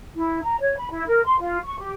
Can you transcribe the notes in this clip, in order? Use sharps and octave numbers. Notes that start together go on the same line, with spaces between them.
E4
A#5
C#5
B5
E4
A#4
C6
F4
C#6
G4